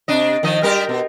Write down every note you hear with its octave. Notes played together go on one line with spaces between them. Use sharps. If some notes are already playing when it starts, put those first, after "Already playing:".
C3 D4 D#5
D#3 F3 D#5
G3 G4 A#4
B2